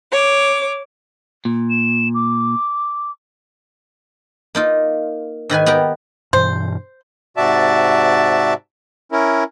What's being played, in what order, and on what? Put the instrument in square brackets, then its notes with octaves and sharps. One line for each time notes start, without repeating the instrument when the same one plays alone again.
[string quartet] C#5 D6
[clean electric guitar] A#2
[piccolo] E7
D6
[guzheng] A#3 D#4 F4
G#2 D#3 B4 G#5
B3 G4 A#4 A#5
[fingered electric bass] G2 B2 E3 [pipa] C5
[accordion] G#2 C3 F#4 D5 E5 A5
C#4 E4 A#4